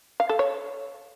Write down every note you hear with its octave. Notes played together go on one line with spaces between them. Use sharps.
F5
A4
C#5